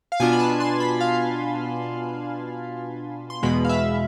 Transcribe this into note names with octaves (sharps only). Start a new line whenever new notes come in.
F5
B2 B3 D4 F4 G#5
B5
A5
C6
B5
F5
C6
E2 B2 G#3 B5
F5
E5